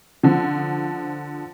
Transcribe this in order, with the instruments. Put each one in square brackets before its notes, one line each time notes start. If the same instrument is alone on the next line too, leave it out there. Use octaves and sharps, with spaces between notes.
[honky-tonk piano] D3 F3